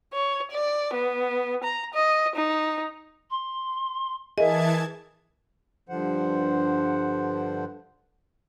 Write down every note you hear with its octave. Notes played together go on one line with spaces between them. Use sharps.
C#5
D5
B3
A#5
D#5
D#4
C6
E3 G#4 A#4 D#5 E5 A5 G#6
G2 D3 F3 C5 F#5